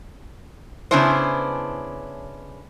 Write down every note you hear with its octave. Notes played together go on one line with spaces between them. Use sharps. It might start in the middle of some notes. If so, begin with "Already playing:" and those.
C#3 B3 C#4 D4 E4 C5